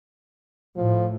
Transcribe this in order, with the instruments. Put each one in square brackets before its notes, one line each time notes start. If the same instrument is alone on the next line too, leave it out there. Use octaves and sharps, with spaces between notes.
[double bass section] A2 [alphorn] F3